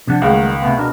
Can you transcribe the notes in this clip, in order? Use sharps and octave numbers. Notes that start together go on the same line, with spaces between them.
C3 F3 D4 F#5
C#2 D#3 G3 A3 F#5
C3 A3 B3
B2 D4 A#4